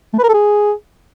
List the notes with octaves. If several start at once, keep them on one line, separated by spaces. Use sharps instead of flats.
A3
B4
A#4
A4
G#4